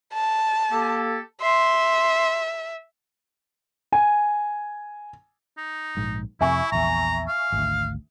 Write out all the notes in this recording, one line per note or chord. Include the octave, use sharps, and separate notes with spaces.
A5
A#3 G4 A4
E5 C6
G#5
D#4
A#1 G#2
F2 C3 E4 E5 G#5 C#6
A#1 E2 A#5
F5
G#1 D2